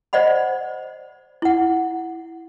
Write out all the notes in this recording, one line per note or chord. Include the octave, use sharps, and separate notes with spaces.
C5 D5 D#5 F#5 B5
E4 F#5